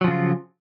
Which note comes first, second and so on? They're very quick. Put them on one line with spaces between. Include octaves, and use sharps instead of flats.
F#3 F3 C#3 F4